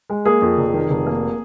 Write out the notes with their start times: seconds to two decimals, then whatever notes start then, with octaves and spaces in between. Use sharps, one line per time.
0.10 G#3
0.25 A#3 G#4
0.42 F2
0.58 F1
0.74 D#3
0.90 F1
1.06 A#3